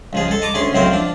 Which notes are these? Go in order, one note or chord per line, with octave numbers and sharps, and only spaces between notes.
C#2 F3 G#4
G#3 A4
D#5 A5 A#5 D6 D#6
D2 C#4 G#4 C6
C#2 A2 F#3 C4 A#4 C5
F3 D4